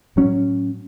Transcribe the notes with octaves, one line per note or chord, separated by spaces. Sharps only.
A2 F#3 C#4